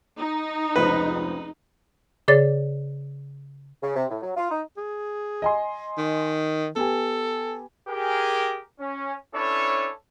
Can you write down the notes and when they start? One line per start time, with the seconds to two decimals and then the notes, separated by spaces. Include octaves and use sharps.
0.18 D#4
0.76 F1 C#2 C4 B4
2.28 C#3 G#4 C#5 D5 A6
3.82 C#3
3.95 C3
4.09 A2
4.22 F#3
4.36 F4
4.51 D#4
4.77 G#4
5.42 D#5 G#5 C6
5.98 D#3
6.76 B3 G4 A4 G#5
7.89 G4 G#4 A#4
8.80 C#4
9.34 C#4 D4 E4 A4 B4 C#5